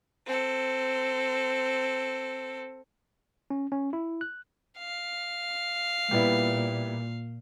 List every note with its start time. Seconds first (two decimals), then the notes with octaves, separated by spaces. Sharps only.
0.25 C4 A4
3.50 C#4
3.72 C#4
3.93 E4
4.21 F#6
4.78 F5
6.11 A#2 G3 B3 E4